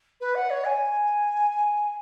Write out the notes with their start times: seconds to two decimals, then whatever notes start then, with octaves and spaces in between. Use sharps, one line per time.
0.21 B4
0.35 F#5
0.50 C#5
0.65 G#5